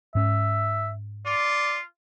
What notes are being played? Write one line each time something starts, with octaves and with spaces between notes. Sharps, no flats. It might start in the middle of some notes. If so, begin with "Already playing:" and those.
G#2 C#4 E5
F4 D5